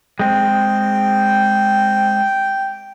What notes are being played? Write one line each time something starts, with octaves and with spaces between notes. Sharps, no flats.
G#3 C4 G5